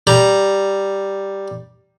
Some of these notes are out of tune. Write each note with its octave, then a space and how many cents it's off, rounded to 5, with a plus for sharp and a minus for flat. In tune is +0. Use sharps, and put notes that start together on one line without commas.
G3 +0 A#5 +0